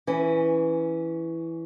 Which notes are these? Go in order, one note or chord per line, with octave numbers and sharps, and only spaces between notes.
E3 C#4